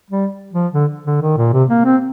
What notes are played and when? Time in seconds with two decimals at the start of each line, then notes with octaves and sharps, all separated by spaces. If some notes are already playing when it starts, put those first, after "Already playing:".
0.11 G3
0.53 F3
0.74 D3
1.06 D3
1.22 D#3
1.37 A#2
1.53 C3
1.70 A#3
1.85 C4